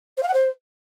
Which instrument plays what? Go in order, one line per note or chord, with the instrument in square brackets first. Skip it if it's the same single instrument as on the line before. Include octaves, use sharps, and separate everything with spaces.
[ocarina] C5
F5
F#5
C5